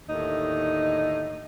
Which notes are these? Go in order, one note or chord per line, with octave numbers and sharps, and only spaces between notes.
D#2 A2 D3 D#4